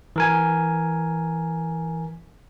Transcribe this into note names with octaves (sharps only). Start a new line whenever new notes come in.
E3 A#4 G#5